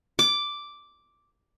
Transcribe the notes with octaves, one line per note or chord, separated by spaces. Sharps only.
D6